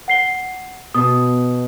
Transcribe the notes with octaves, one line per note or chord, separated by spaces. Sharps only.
F#5 C7 G7
B2 D#6